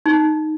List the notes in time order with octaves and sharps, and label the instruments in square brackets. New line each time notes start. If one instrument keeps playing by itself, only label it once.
[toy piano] D#4